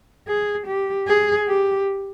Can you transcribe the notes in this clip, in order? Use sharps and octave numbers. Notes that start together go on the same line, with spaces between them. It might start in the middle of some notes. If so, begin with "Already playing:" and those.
G#4
G4
G#4
G4